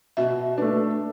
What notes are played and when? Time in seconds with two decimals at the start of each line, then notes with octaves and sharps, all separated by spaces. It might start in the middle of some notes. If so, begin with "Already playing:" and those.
0.17 B2 E5
0.58 A3 D4 B4